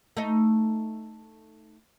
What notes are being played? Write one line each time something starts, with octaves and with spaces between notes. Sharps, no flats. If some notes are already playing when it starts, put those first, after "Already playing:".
A3 D#4